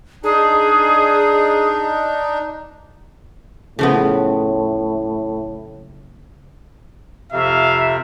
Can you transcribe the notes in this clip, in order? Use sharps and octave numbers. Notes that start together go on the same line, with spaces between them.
D4 D#4 G#4
F#1 A2 C#3 F3 B3
F2 C3 E5 F5